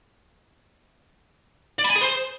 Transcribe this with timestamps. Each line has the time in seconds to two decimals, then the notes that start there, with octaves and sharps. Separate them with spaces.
1.79 D5
1.85 B5
1.90 G#5
1.96 G#4
2.02 C5